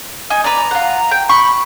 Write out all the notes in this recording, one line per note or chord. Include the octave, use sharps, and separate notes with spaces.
D#4 G#5
B4 D5 A#5
F4 F#5
G5
B5 C#6